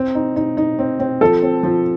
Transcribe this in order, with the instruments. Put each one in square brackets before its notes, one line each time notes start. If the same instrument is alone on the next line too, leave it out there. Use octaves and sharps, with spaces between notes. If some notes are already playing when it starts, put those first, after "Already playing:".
Already playing: [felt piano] C4
D#4
D#4
D#4
C4
C4
[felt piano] F3 [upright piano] A4
[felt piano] C4
F3